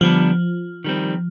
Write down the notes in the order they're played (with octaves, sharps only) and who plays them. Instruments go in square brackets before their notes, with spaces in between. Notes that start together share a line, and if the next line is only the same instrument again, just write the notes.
[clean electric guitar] D3 G3 B3 D4 [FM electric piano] F3
[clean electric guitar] D#3 G3 C4